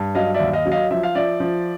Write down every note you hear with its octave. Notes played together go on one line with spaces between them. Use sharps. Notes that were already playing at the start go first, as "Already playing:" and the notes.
Already playing: G2
F#3 D#5 F5
D5 E5
D#2
D#5 F5
F#3
D#5 F5
F3 E5
F5
F3 D5 E5
F3